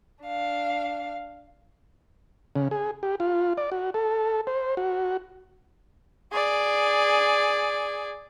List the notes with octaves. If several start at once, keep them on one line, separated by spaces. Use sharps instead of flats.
D4 F5
C#3
G#4
G4
F4
D5
F#4
A4
C5
F#4
G#4 D5